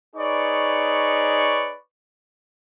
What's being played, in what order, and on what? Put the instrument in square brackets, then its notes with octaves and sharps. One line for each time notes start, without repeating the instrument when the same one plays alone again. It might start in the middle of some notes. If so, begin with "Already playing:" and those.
[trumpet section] D#4 G#4 B4 C#5 D5 C#6